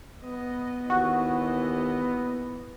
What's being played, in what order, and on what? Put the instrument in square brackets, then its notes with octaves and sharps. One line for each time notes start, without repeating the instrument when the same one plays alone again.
[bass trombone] B3 [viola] D#5
[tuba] D#2 [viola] E3 D#5 [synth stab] F#4